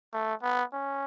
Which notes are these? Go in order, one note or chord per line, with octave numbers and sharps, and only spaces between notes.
A3
B3
C#4